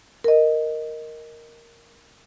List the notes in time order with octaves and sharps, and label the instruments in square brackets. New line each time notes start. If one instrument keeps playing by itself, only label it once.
[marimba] A#4 D#5